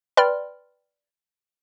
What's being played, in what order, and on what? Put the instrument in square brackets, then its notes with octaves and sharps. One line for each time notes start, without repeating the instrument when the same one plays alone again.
[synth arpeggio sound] B4 D5 G5 B5 C6 F6